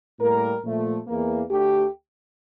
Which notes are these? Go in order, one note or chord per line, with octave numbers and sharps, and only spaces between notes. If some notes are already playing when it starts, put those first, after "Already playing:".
A2 G3 A#3 A#4
A#2 F3 A3
E2 E3 A#3
D2 D3 A3 G4